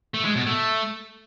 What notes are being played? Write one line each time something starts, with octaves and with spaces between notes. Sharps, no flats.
A3
G#3
B2
A3